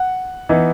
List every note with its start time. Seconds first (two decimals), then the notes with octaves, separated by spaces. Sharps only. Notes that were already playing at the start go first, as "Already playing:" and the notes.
Already playing: F#5
0.49 E3 B3 D#4